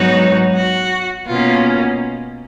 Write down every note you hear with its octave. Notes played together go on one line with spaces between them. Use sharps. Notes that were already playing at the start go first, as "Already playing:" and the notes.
Already playing: G#2 F#3 B3 D#4 F#4
F#4
B2 A#3 C#4 F4